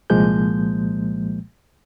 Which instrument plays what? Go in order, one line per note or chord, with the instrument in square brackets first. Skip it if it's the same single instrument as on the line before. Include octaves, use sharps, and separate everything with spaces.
[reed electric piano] C2 A#2 F3 G#3 A#3 G6